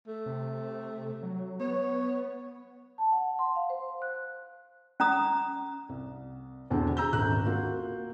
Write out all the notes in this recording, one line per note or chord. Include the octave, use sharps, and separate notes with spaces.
A3
C3
F#3
B3 C#5
A5
F#5
C6
F5
C5
F#6
C#4 A#5 D#6
C2
E2 B2 D3 C4 D4
G#4 A#5 E6 G6
D#1 G#1 D3 F#6
A#3 F4 F#4